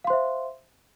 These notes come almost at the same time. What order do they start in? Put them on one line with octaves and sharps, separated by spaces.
F5 C6 C5 E5